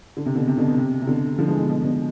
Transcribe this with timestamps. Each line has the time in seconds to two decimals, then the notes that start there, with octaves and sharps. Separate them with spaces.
0.17 D3
0.26 C3
0.36 B2 D3
0.48 C3
0.58 B2 D3
0.68 B2
0.77 C3
1.02 C3
1.07 B2 D3
1.38 D3 F3
1.48 E3 G#3
1.58 B2
1.69 B2
1.83 B2 D3